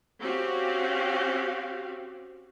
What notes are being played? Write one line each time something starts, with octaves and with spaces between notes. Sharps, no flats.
C4 C#4 F#4 G4 F5